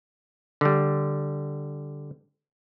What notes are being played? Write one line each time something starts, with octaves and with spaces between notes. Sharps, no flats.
D3 G3